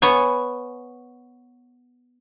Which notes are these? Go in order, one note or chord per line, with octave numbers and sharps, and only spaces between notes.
B3 C#5 G#5